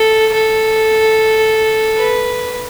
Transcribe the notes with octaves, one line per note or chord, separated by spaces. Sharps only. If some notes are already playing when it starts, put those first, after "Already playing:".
Already playing: A4
A4
B4